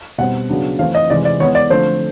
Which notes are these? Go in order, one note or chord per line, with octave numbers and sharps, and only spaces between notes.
B2 G3 C4 F#5
C#3 F#3 B3 D4
E3 A3 C4 F5
D#5
C3 E3 G#3 D5
D5
E3 G#3 B3 C#5
D5
D3 F3 A3 C4 C5